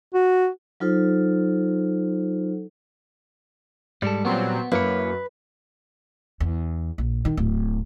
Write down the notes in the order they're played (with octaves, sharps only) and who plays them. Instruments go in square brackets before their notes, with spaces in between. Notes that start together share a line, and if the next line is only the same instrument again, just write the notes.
[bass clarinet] F#4
[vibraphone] F#3 D#4 F4 A4 C5
[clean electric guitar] G#2 G#3 A4 [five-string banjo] G3
[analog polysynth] A#2 F#3 C4 [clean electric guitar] B3
[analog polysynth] F#2 [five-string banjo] A#3 [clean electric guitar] E4 C#5 [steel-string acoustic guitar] B4
[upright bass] E2
A#1
D#3
D1